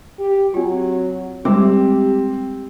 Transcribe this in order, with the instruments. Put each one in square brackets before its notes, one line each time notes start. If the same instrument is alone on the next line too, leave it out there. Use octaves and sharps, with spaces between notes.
[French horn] G4
[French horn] F#3 [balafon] C4 F4
[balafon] G3 G#3 D6 [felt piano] C4 [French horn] G4